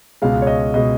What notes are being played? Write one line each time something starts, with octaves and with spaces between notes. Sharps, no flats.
C#2 B2 G#3 F5
C#5
D#5
B2 G#3 D#5